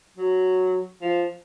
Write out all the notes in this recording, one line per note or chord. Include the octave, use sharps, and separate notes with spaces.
F#3
F3